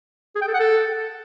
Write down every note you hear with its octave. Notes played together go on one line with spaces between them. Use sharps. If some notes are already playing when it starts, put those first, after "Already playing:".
G#4
G5
A4
F#5
A4